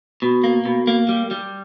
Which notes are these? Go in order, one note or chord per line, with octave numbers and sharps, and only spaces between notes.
B2
A#3
B2
A#3
G3
G3